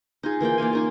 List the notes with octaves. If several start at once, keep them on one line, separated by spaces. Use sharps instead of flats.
D#4 F4 G#4
E3 A#3 F4 G5
A#3 D5 F5 G#5
C#4 D#4 G#5